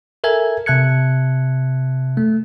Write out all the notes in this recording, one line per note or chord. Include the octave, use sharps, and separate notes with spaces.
A4 A#4 E5 G#5 G#6
C3 E5 A5 F#6 G#6 C#7
A3